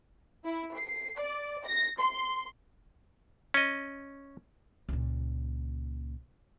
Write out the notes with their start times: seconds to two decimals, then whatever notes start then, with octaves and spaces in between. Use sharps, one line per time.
0.45 E4
0.75 C7
1.19 D5
1.66 A#6
2.00 C6
3.54 C#4 D#5
4.89 C#2 A#2